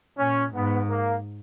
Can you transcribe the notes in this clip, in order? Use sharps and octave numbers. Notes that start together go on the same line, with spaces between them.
A#2 C#4
G#2 B3
A#3